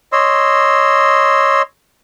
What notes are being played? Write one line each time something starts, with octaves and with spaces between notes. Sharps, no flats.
C#5 D#5 C6 E6